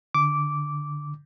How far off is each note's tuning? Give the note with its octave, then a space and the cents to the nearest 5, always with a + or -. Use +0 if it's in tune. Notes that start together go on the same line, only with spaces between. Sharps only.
D3 +0 D6 -10